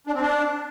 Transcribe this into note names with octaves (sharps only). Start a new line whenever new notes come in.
D4
C4
D4